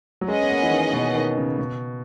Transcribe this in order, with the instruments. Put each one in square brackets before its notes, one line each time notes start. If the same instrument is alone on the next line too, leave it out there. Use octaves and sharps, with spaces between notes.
[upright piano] F#3
[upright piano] G#3 [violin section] C#4 G#4 B4 D#5 F#5
[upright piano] B3
A#3
E3
D#3
B2
D#3
C#3
B2